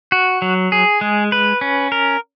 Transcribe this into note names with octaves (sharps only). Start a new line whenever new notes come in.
F#4
F#3
G#4
G#3
B4
C#4
A#4